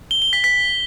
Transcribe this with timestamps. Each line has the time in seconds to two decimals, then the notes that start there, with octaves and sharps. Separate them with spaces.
0.11 G7
0.22 G7
0.33 B6
0.44 B6